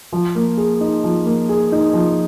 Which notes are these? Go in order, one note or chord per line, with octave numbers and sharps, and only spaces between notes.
F3
A#3
G#4
D#4
F3
A#3
G#4
D#4
F3